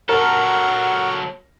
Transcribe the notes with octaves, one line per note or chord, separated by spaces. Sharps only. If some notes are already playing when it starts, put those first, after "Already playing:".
F#3 A4 A#4 F#5 A#5 C#6 F6